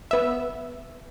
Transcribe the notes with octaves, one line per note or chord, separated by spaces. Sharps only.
B3 E5